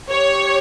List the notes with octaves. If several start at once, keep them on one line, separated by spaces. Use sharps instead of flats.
G4 C#5